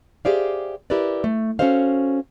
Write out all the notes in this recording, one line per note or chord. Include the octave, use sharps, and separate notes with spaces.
G4 G#4 C5 D5 E5 F5
E4 G4 A#4 B4 D5
A3
C#4 D#4 F#4 A4 C5 F5